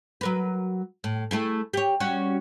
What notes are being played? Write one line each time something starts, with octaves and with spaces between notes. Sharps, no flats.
F#3 A#4 B4
A2
A3 E4 G#4
G4 C#5
G3 C#4 F#4